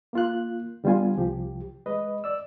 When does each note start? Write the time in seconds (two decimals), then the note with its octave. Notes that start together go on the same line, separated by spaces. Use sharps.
0.13 A#3 F4 F#6
0.84 D3 G3 B3 F4 G#5
1.17 C2 F3 G4
1.86 G#3 B4 D#5
2.24 D5 E6